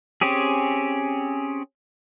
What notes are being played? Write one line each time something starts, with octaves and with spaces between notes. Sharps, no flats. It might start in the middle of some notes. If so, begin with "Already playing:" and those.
C4 C#4 G4 G#4